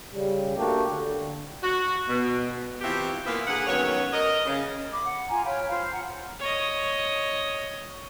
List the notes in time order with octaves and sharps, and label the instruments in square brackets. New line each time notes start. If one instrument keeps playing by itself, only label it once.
[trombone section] C#3 G3
A3 A#3 D4 F#4 G4
D3
[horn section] F#4
B2
[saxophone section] E3 F3 C4 F#4 G4 E5
A#2 E3 A#3 B3 E5 F5
D3 A#3 G#4 F#5
F#2 D#3 B3 C#5
A#4 D#5
C#3
[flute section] B5 D6
F#5
F4 G#5 A#5
C#5 F5 G5 B5
F4 C5
F#5 A#5
[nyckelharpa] C#5 D#5